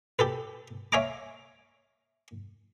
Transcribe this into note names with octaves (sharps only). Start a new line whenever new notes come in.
G4 A4 B4
C#5 E5 F5 G#5 A#5 D6